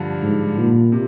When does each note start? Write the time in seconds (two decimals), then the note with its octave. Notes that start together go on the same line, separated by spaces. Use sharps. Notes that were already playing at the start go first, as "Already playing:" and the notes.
Already playing: G2 D3 F3
0.23 G#2
0.58 A#2
0.92 C3